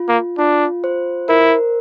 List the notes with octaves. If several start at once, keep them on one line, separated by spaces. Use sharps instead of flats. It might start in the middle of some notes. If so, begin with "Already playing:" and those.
Already playing: F4
A#3
D4 F4
C5
E4 A#4